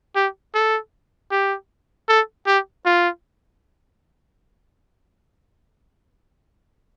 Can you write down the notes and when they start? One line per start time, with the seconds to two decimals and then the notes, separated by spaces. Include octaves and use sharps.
0.15 G4
0.55 A4
1.31 G4
2.09 A4
2.47 G4
2.85 F4